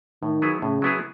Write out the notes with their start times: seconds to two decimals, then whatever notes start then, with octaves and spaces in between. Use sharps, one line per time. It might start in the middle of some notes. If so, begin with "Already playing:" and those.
0.22 A2 D#3
0.42 F#3 B3 E4 G#4
0.62 A2 C#3
0.82 F#3 B3 E4 G#4